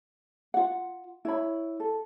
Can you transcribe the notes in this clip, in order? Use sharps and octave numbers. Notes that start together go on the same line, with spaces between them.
F4 F#5
E4 C#5 B5
A4